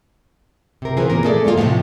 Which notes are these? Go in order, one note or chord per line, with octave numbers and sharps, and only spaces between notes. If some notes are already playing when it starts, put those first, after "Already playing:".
C3 A#4
E3 C4 F4 G#4
A#2 A#3 A#4
A3 G#4 A4 D5
C3 G#3 A#3 F4
A2 C3 F3 F#3 G#3 A3